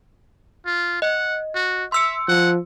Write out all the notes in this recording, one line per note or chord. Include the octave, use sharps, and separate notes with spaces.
F4
D#5 F#5
F#4
E5 C6 E6 C#7
F3 F#5